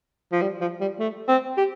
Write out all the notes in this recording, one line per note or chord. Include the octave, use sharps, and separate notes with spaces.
F3
G3
F3
G3
A3
C4
G4